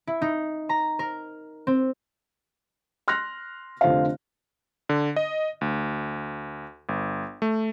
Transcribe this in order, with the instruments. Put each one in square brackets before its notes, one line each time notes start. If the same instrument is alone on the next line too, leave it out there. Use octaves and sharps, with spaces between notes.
[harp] E4
D#4
A#5
A#4
C4
[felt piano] C6 F6 F#6 A#6
F1 D3 F4 C5 F5
[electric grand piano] D3
D#5
D2
G1
A3